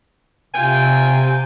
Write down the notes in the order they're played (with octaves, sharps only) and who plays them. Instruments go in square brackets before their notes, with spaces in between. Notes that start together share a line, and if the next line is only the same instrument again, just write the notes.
[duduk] C3 [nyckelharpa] F4 G5 [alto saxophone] G#5